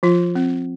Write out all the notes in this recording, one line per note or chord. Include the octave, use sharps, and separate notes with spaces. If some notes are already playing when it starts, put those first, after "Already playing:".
F3 F4
C4